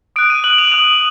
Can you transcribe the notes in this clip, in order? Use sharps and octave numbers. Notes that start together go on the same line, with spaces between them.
D#6 F#6 D7
D#7
D#6 F#6 F#7
F7
D#6 F#6 F7